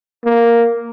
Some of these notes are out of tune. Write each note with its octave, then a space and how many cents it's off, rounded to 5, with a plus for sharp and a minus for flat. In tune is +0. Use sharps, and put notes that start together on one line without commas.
A#3 +0